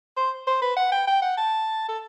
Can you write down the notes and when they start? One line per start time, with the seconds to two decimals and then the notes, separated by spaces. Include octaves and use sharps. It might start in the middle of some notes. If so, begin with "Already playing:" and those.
0.17 C5
0.47 C5
0.62 B4
0.76 F#5
0.91 G5
1.07 G5
1.22 F#5
1.37 A5
1.88 A4